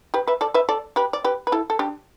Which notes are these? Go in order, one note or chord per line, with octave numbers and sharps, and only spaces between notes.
G4 B4
B4 E5
A4 D5
B4 E5
A4 D5
G4 B4
D5
G4 B4
B4
E4 A4
A4
D4 G4